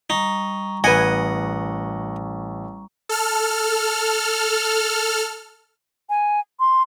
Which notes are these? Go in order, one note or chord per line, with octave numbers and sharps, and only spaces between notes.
G3 D#4 A#5 C#6
A1 B4 D#5 F#5 G#5
A4 F6
G#5
C6